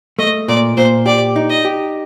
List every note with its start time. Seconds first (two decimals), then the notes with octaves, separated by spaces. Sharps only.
0.19 A3 D#5
0.48 A#2 D5
0.77 A#2 C5
1.06 G4 D5
1.36 D#4
1.50 D#5
1.65 G4